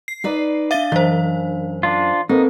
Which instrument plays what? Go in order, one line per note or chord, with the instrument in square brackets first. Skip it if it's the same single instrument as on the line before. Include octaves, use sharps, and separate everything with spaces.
[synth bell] C7
[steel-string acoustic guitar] D#4 B4 D5
[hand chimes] D4 F5 [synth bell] E5 A6 G7
[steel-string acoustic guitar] F#2 [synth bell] E3 C5
[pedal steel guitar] D4 F4
[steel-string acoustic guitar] A#3 [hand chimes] C4 A4 B4 [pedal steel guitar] D#4